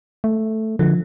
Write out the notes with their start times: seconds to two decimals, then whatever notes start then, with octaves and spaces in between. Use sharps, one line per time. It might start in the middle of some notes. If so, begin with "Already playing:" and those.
0.24 A3
0.79 D3 F3